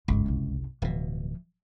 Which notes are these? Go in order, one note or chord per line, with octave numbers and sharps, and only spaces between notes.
G1 C#2 G#2
F#1 C2
D1 B2 E3 F3